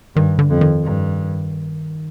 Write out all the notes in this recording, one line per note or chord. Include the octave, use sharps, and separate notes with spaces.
G2 D#3
D3
F2
D#3
G2